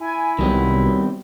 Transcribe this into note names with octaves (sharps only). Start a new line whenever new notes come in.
E4 G#5
C2 D#3 F#3 G3 B3 C4